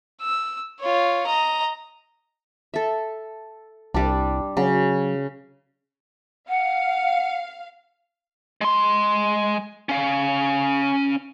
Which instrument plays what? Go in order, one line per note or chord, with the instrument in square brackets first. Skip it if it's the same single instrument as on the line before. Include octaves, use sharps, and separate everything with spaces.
[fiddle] E6
F4 C#5
D#5 A#5
[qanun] A4 E5
[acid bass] C2 [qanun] G3 D4
[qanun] C#3 [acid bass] F#3
[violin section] F5 [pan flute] F#5
[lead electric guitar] G#3 C6
C#4 F5